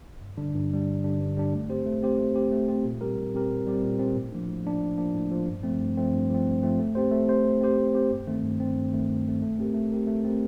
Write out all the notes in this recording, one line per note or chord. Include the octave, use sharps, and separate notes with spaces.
G2
D3 G3 D4
G2
D3 G3 D4
G2
D3 G3 D4
G2
D3 G3 D4
A3
C4 G4 C5
A3
C4 G4 C5
A3
C4 G4 C5
A3
C4 G4 C5
A#2
G3 C4 G4 A#4
A#2
G3 C4 G4 A#4
A#2
G3 C4 G4 A#4
A#2
G3 C4 G4 A#4
A2
F3 A#3 D4
A2
F3 A#3 D4
A2
F3 A#3 D4
A2
F3 A#3 D4
G2
F3 A3 C4
G2
F3 A3 C4
G2
F3 A3 C4
G2
F3 A3 C4
A3
C4 G4 C5
A3
C4 G4 C5
A3
C4 G4 C5
A3
C4 G4 C5
G2
D#3 A3 C4
G2
D#3 A3 C4
G2
D#3 A3 C4
G2
D#3 A3 C4
A3
C4 G4 A#4
A3
C4 G4 A#4
A3
C4 G4 A#4